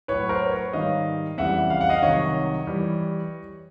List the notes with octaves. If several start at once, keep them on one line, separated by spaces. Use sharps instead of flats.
A2 F#3 B4 C#5
A#4 C5
B4 C#5
G#2 D#3 G3 D#5 F5
F2 C#3 E3 G3 E5 F#5
F5
F#5
D#5 F5
C2 C3 D#3 F#3 C#5 D#5
E3 G3